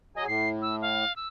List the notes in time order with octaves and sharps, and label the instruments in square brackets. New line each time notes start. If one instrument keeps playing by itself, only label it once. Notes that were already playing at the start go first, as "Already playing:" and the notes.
[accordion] F#3 G#4 G#5 [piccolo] D#5
[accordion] A2 [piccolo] C7
[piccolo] E6
F5
E6